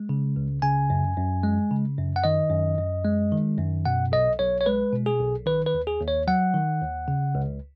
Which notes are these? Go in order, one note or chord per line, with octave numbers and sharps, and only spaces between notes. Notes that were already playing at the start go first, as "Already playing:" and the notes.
Already playing: G#3
C#3
C#2
C#3 G#5
F#2
F#2
G#3
C#3
F#2
F#5
D#3 D#5
F#2
F#2
G#3
D#3
F#2
B2 F#5
B1 D#5
B1 C#5
C#5
G#3 B4
B2
G#4
B1
D#3 B4
B4
D#2
G#4
D#2
C#5
F#3 F#5
D#3
D#2
C#3
C#2